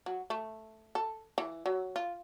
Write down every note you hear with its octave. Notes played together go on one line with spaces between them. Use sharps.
F#3
A3
A4
E3
F#3
F4